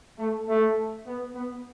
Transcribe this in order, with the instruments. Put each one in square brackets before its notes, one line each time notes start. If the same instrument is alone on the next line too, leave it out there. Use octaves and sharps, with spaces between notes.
[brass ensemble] A3
A3
B3
B3